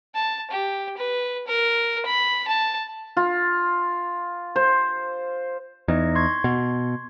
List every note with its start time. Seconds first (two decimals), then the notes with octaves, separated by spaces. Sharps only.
0.15 A5
0.51 G4
0.98 B4
1.47 A#4
2.06 B5
2.48 A5
3.17 F4
4.56 C5
5.88 E2 D#4 D#5
6.15 C6 C#6 G#6
6.44 B2